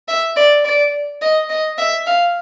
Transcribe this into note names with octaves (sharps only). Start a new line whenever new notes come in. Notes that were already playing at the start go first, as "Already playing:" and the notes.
E5
D5
D5
D#5
D#5
E5
F5